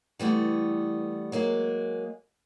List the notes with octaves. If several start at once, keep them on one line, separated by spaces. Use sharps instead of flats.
E3 G3 A3 B3
F#3 G#3 A#3 G#4